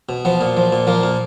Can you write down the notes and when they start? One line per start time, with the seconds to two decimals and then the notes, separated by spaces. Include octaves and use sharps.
0.09 B2
0.25 F3 B3
0.41 A#2
0.57 F3
0.72 A#2
0.87 F3 A#3
1.03 A#2